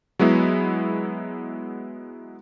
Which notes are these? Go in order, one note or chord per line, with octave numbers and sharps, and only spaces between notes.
F#3 G#3 B3 E4